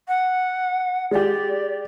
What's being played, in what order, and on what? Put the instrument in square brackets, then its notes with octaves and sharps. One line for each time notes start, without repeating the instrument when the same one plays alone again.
[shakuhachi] F#5
[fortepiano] G#3 G4 [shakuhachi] D5